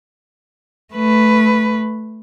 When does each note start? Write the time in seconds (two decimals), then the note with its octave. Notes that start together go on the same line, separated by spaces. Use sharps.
0.94 A3 B4